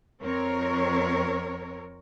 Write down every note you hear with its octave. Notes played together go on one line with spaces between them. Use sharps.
F2 C4 A#4 C#5